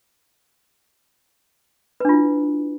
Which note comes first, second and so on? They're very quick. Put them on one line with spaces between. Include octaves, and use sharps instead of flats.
B4 D4 F4 E4